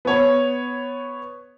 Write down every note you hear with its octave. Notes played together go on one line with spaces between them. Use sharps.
B3 C#5